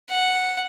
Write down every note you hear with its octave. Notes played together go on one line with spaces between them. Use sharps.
F#5